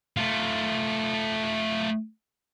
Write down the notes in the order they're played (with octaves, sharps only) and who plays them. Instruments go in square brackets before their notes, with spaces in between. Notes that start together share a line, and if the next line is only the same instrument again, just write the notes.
[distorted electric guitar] A3 F4